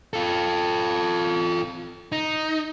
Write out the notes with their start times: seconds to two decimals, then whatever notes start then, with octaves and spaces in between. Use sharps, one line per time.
0.14 F4 A4
2.12 D#4